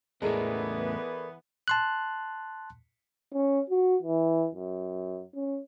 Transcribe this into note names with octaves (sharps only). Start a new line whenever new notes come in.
E2 A2 E3 G#3 B3 A4 A#4 D5
A5 C6 F#6
C#4
F#4
E3
F#2
C#4